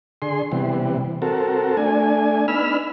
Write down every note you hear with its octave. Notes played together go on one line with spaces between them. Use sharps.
D3 G#4 C6
C3 E3 G3 B3
C4 F#4 A4 A#4
A3 D4 G#5
B3 D4 D#4 B5 E6 F6